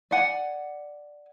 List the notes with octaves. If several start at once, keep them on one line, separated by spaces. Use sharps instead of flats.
D5 F#5 G#5